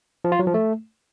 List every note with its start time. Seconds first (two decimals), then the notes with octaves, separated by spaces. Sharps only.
0.24 F3
0.32 F4
0.39 F#3
0.47 F3
0.54 A3